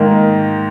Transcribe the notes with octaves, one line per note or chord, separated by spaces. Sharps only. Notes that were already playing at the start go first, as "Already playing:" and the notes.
Already playing: G#2 D#3 A#3